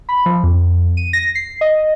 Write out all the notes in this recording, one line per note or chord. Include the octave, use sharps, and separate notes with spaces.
B5
F3
F2
D#7
A#6
C7
D#5